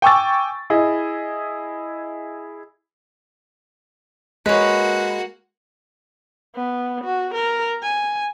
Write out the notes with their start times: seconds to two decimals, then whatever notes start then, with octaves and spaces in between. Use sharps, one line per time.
0.02 G5 G#5 C#6 D6 E6 A6
0.70 E4 G#4 D#5
4.46 G#3 A#3 F#4 B4 C#5
6.55 B3
7.05 F#4
7.35 A#4
7.83 G#5